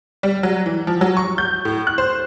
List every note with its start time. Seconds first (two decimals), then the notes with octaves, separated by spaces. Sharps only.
0.23 G3
0.43 F#3
0.66 E3
0.87 F3
1.01 F#3
1.17 C#6
1.38 G6
1.65 A2
1.87 F#6
1.98 C5